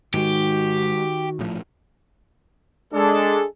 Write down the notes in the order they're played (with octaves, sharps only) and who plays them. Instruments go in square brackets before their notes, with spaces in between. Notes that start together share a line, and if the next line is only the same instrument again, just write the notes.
[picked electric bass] G#2 G#3 [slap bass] D#3 [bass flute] F#4 [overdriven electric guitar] G4
[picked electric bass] A#1 A2 F3
[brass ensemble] G#3 D4 G#4 A4